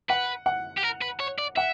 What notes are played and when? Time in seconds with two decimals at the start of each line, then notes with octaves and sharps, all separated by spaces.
0.10 B4 F#5
0.46 F#5
0.77 G4
0.83 A#4
1.01 B4
1.20 C#5
1.38 D5
1.56 E5 F#5